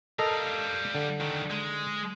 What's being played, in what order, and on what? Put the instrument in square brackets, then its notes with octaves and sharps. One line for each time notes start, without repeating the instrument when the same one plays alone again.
[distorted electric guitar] G3 F5 [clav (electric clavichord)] A4 A#4 D#5
[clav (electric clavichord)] D3
[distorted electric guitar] D#3 A3
G#3